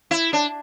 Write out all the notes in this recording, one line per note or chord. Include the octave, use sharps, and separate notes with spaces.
E4
D4